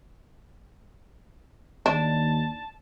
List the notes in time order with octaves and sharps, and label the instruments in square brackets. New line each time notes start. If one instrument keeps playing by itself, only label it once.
[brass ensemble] D#2 [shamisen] D4 [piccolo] A5